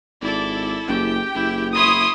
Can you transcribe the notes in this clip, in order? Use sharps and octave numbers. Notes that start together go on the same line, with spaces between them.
G#1 E4 A4 D5
F#1 G4 G5
F#1 E4
E4 C#5 B5 C6 D#6